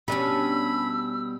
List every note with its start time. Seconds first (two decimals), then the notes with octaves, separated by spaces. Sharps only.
0.08 B2 G3 C#4 D4 G4 B5 E6